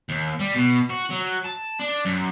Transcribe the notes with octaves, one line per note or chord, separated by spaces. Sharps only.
D#2
G3
B2
F#4
F#3
A5
D4
F#2